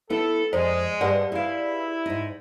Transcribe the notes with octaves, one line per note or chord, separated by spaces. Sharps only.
B3 E4 A4
F2 G#3 C5 D5
G2 G4 B4 D5 F#5
E4 G#4 F5
G#2 D#4